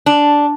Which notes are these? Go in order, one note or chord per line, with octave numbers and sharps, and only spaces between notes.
D4